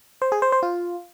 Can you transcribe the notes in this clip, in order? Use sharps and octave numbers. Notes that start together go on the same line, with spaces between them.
C5
G#4
C5
C5
F4